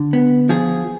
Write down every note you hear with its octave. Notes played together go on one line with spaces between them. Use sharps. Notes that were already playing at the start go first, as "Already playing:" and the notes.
Already playing: D3
B3
F3 G#4